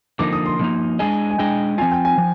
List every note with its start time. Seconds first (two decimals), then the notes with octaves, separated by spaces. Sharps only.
0.19 D3 F3 A#3 D#4 D6
0.33 D#6
0.46 C6
0.59 D3 F3 A#3 D#4
0.99 G#3 D4 G#4 D#5 G#5
1.31 G#5
1.38 G#3 D4 G#4 D#5 G5
1.78 F3 C4 F4 G#5
1.92 G5
2.05 G#5
2.18 F3